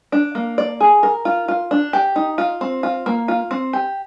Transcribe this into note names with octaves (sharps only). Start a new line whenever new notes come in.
D4
A#3
D5
G#4
A#4
F4
F4
D4
G4
D#4
F4
C4
F4
A#3
F4
C4
G4